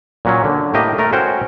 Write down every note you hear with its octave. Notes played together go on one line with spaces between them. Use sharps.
A#2 F#3 C#4
D3
A2 A#3 G4 D#5
A3 A#4
C#4 F#4 C5 G5